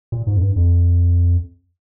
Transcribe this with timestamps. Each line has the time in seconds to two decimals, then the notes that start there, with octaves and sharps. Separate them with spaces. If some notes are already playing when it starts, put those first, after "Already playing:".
0.12 A#2
0.27 G#2
0.36 F2
0.41 G2
0.56 F2